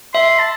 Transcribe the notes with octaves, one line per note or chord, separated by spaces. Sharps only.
E5 C6
A5